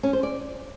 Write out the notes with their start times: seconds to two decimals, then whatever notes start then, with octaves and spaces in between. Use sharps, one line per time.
0.03 C#4
0.13 C5
0.23 D5